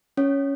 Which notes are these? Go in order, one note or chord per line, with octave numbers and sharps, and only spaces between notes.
C#4 C#5